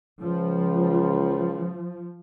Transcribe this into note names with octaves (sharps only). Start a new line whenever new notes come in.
C#2 F3